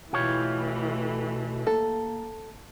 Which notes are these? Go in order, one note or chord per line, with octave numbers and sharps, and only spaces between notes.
B2 E3 A3 F4 G4 C#5
A#3 A4